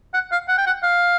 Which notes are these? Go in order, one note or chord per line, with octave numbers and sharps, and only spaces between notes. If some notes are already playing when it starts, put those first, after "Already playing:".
F#5
F5
F#5
G5
F#5
F5